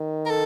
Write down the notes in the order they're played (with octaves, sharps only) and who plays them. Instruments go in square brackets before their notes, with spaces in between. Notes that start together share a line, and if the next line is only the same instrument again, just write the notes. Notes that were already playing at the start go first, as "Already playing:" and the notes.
Already playing: [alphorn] D#3
[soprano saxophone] A#4
A4